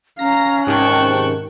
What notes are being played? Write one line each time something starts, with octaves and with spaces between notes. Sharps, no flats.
C#4 F5 A#5 A#6
G#2 C3 D#3 G5 A5 C#6 F#6